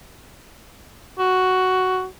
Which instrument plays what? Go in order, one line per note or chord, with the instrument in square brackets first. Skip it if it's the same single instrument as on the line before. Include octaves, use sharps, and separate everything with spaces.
[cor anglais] F#4